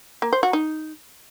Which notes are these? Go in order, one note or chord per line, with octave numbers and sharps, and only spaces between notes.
A#3
C5
F#4
D#4